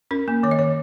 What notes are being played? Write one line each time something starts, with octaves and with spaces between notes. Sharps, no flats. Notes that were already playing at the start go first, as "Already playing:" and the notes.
C#4 A#4
A#3
D#3 C#5
D#5
D#3 C#5